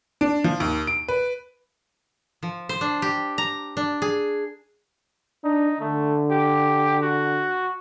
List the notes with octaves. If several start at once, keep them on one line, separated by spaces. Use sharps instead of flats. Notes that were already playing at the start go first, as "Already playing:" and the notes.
D4
F3
D#2
D7
B4
F3
C5
D4
G4
A#5
D4
G#4
D4 D#4
D3 A3
G4
F#4